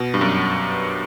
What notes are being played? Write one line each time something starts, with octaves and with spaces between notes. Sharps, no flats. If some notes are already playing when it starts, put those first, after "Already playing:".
Already playing: B2
G2
F#2